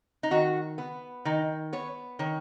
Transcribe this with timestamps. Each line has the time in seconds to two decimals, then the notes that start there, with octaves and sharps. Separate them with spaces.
0.23 D#4
0.31 D#3 F#4
0.78 B3
1.25 D#3 D#4
1.73 B3 C#5
2.19 D#3 C#5